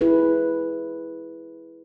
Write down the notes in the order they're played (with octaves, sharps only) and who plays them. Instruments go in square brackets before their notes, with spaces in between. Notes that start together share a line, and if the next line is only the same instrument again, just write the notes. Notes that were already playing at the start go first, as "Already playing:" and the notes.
[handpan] E4 G#4 B4